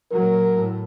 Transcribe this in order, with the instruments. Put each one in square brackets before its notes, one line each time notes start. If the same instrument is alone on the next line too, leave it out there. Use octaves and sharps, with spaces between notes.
[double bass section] A#2 F#3 [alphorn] A#4
[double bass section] A2